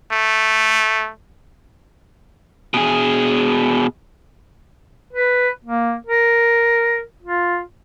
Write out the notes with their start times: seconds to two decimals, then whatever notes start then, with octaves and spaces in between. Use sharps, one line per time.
0.13 A3
2.74 B2 G#4
5.13 B4
5.65 A#3
6.07 A#4
7.23 F4